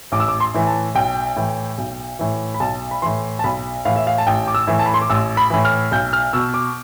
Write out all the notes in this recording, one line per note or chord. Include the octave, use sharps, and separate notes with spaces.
A1 D6
E6
D6
C6
A2 E3
A5
B1 G5
A2 E3
B1
A2 E3
B5
B1 A5
B5
A2 E3 C6
A5
B1 B5
A2 E3 F5
E5
F5
A5
A1 G5
D6
E6
A2 E3
A5
B5
C6
D6
A1 E6
B5
A2 E3
F6
B1 G6
F6
B2 E6
D6